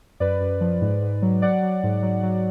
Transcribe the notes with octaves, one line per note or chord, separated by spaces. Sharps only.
F#2 B4 D5
F#2
F3
G#2
G#2
F#3
F#3 D5 F#5
F#3
G#2
F#3
F#3